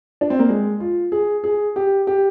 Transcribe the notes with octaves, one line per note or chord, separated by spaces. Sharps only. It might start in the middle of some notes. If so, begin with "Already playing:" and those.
D4
C4
A#3
G#3
F4
G#4
G#4
G4
G4